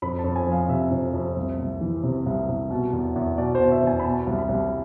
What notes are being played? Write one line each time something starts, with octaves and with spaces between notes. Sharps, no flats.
F2 B5
A5
F2
G#5
F3 F5
C3 E5
F2
F2
C2
C2
E3
C3
C2
C2
B2
E2
E2
B2 D5
B2 C5
E5
E2 G#5
B5
B2 A5
C2
B5
C2